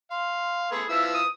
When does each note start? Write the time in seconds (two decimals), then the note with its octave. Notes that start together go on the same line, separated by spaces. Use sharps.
0.11 F5 C6
0.72 A3 B3 G#4 B4
0.89 F3 E4 B4 E5 E6
1.14 D#6